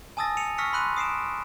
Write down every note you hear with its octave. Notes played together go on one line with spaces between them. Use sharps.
G#5 A5 D#6 E6 A6 A#6
C#7 D#7 F7
C#6 E6 F6 A#6 B6 C#7
B5 C6 F#6 D#7
D#6 C7 D7 E7